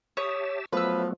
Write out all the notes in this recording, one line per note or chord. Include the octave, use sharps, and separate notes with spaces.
G4 C#5 E5 A5 D#6
F3 F#3 A3 B3 B4 E6